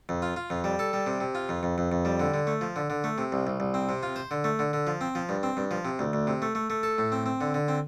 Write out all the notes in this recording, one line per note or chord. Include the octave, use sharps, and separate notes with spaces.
F2
F4
F4
F2
G3
A4
G3
C3
C3
F4
F2
F2
F2
F2
G3
D3
D3
A3
F3
D3
D3
A3
C3
C2
C2
C2
C4
C3
F4
C5
D3
A3
D3
D3
F3
C4
F3
G2
C4
G2
F3
C3
D2
D2
C3
A3
A3
A3
A4
A2
C4
C4
D3
D3
C4